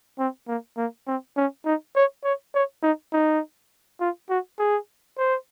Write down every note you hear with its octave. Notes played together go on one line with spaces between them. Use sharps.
C4
A#3
A#3
C4
C#4
D#4
C#5
C#5
C#5
D#4
D#4
F4
F#4
G#4
C5